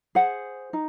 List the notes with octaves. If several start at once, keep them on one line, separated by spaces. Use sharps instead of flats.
G#4 C5 F#5
D#4